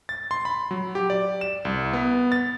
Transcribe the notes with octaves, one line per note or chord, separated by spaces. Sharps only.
A6
C6
B5
F#3
G4
D5
E7
C2
B3
A6